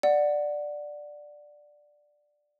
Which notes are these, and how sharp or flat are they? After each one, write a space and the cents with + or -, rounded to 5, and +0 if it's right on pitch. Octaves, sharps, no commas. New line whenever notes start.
D5 +10 F#5 -5